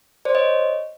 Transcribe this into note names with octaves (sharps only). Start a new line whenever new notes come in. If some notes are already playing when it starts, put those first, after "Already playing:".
C5 D5
C#5 D#5